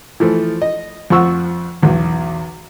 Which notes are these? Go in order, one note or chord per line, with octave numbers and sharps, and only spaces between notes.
E3 F3 A3
D#5
F2 F3 F4 F#5 C#6 E6
B1 E2